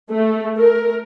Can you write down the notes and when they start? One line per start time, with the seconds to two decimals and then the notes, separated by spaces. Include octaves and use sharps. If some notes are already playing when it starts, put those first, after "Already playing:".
0.11 A3
0.58 A#4